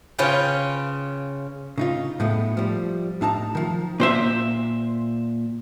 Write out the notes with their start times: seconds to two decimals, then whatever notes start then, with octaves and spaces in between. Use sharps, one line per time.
0.18 C#3 C#4 F4 B4 G5
1.78 C#3 D#4 F4
2.20 A2 G#3 A3 B3
2.57 F3 G3
3.21 A2 D#4 A5 A#5
3.55 D#3 F3
4.00 A#2 C5 E5